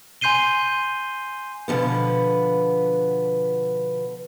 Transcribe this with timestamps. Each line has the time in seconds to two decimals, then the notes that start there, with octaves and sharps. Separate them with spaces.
0.21 G#5 C6 G6 C7 D#7 G7
1.68 B2 D3 D#3 F3 B3